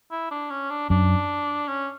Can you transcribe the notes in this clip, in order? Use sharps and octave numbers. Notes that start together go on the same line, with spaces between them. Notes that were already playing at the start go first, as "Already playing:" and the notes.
E4
D4
C#4
D4
F#2 D4
C#4